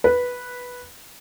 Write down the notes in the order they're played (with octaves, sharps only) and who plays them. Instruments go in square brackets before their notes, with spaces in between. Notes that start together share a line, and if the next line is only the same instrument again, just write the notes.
[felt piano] B4